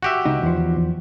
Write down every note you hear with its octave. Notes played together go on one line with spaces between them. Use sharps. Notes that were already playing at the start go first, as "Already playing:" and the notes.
F#4 G4 E5
C#2 D#4
E2 F3